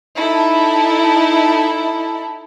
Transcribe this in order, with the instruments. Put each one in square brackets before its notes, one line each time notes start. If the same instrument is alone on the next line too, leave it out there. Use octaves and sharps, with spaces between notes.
[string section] D#4 E4 A4